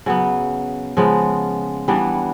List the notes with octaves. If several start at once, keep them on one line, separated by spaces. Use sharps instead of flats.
C#3 F#3 B3
C#3 F3 G#3 B3
E3 G3 B3 D4